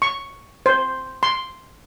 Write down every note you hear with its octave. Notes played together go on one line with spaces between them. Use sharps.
C#6
C5
C6